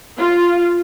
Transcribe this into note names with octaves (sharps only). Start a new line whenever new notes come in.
F4